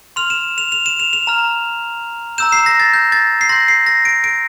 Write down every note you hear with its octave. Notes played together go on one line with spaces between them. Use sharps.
C6 F6 F7
E7
F7
F7
E7
F7
F7
A#5 F6
A#5 E6 G6 E7
C7
A#6
A6
G6
A6
C7
C6 G6 A#6
C7
A#6
D7
D7